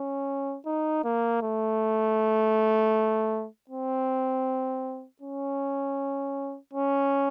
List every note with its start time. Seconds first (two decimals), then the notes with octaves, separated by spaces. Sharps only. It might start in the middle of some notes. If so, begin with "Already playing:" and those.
Already playing: C#4
0.66 D#4
1.04 A#3
1.42 A3
3.70 C4
5.22 C#4
6.74 C#4